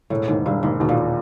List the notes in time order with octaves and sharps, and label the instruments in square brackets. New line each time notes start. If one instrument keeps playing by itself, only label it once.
[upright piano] E1 [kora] A2
[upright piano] D#2 [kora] G#2
[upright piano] E1 [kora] G2
[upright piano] D#2 [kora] G#2
[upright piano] D#2 [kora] B2
[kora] A#2